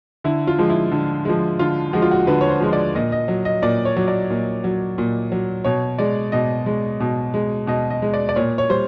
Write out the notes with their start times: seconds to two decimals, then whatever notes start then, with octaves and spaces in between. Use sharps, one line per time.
0.24 D3 E4
0.47 F4
0.58 F3 G#3
0.70 E4
0.92 D3
1.25 F3 G#3
1.59 D3 F4
1.93 F3 G#3 F#4
2.02 F4
2.11 F#4
2.27 D3 B4
2.41 C#5
2.49 C5
2.60 F3 G#3
2.73 D5
2.95 A#2 D#5
3.12 D#5
3.28 F#3
3.45 D#5
3.62 A#2 D5
3.85 C#5
3.96 F#3
4.08 D5
4.31 A#2
4.64 F#3
4.98 A#2
5.32 F#3
5.64 B2 C#5
5.99 G#3 D5
6.32 B2 D#5
6.66 G#3
7.00 B2
7.34 G#3
7.67 B2 D#5
7.90 D#5
8.02 G#3
8.14 D5
8.29 D5
8.36 A#2 C#5
8.58 C#5
8.69 G3 C5